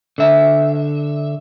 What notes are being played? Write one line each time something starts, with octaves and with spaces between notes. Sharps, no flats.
D3 E5